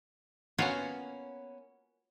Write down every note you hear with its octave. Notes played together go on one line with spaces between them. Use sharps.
A#3 B3 C#4 F4 F#4 C#5